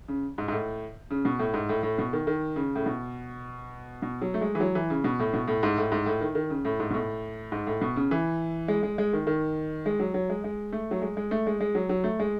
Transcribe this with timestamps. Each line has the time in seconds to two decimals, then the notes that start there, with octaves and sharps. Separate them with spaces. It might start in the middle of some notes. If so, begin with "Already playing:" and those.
0.08 C#3
0.38 G#2
0.48 G#2
0.52 A2
1.11 C#3
1.25 B2
1.39 A2
1.54 G#2
1.69 A2
1.83 A2
1.98 B2
2.13 D#3
2.27 D#3
2.56 C#3
2.75 A2
2.86 B2
4.02 B2
4.22 F#3
4.34 A3
4.41 G#3
4.55 E3
4.60 F#3
4.75 E3
4.90 C#3
5.04 B2
5.19 A2
5.34 B2
5.48 A2
5.63 G#2
5.77 A2
5.92 G#2
6.06 A2
6.21 D#3
6.35 D#3
6.50 C#3
6.65 A2
6.79 G#2
6.90 B2
6.94 A2
7.52 G#2
7.67 A2
7.81 B2
7.96 C#3
8.11 E3
8.68 G#3
8.83 G#3
8.98 G#3
9.13 D#3
9.27 D#3
9.86 G#3
10.00 F#3
10.14 F#3
10.30 G#3
10.44 G#3
10.72 A3
10.91 F#3
11.02 G#3
11.17 G#3
11.31 A3
11.47 G#3
11.60 G#3
11.75 F#3
11.89 F#3
12.04 A3
12.19 G#3